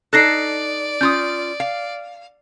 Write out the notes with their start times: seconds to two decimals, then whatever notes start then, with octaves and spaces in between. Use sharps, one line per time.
0.13 D#4 A4 D5 F#6 A#6 C7
1.01 C#4 F4 D#6 G6
1.60 F5